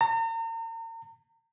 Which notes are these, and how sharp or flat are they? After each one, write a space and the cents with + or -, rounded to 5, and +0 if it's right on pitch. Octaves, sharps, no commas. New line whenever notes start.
A#5 -40